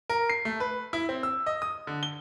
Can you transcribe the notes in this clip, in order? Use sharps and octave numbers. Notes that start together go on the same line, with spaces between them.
A#4
C7
A3
B4
E4
C4
E6
D#5
D#6
D3
G7